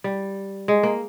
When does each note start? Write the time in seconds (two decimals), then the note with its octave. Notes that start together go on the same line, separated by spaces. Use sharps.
0.04 G3
0.68 G#3
0.83 A#3